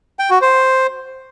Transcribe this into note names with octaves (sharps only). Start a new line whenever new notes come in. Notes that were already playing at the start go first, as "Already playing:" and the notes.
G5
F#4
C5